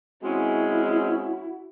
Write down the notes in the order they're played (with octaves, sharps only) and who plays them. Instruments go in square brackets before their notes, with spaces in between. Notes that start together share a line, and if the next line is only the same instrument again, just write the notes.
[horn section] G#3 C4 C#4 [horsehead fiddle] E4 [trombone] F#4